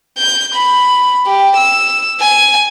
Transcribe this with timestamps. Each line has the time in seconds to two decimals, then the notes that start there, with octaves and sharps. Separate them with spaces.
0.18 G6
0.55 B5
1.26 G4
1.57 E6
2.20 G#5